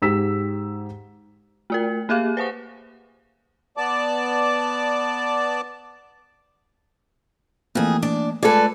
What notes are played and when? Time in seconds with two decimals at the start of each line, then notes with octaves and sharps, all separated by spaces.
0.02 G#2 G4 E6 B6 E7
1.70 A3 F4 A#4
2.09 A#3 G4 G#4 F5
2.37 B4 C5 F#5 C#6
3.77 B3 D5 A5 D6
7.75 F2 E3 A3 A#3 G#4
8.03 D4 D5
8.43 G#3 A3 F4 G#4 A4 B4 D5